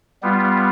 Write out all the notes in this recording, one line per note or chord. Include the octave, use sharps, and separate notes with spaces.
G3 B3 F4